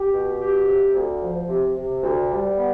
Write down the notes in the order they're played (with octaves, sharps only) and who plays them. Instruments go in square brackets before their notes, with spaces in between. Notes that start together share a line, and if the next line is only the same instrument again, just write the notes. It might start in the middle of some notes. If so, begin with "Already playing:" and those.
Already playing: [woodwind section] G4
B2
G4
C3
D2
F3
C3
C3
D2
G3
B3